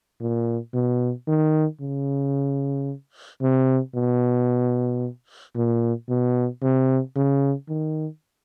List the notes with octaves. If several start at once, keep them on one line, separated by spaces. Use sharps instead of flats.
A#2
B2
D#3
C#3
C3
B2
A#2
B2
C3
C#3
D#3